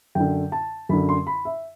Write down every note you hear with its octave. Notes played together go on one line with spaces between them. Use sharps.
F#2 D3 G5
A5
F#2 D3 B5
C6
B5
E5